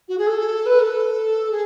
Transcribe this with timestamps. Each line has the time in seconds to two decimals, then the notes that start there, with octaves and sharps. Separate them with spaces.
0.08 F#4
0.18 G#4
0.27 A4
0.66 B4
0.80 A4
1.51 G#4